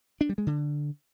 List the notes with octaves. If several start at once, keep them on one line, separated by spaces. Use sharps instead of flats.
D4
G3
G#3
D3